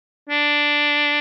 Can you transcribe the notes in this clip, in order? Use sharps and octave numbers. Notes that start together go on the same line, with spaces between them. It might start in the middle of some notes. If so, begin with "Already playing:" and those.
D4